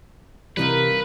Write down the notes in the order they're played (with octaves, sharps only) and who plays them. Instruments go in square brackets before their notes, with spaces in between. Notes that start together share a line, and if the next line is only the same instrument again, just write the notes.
[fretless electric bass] C3 E3 G3 [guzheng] A#3 D#4 F4 [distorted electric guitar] B4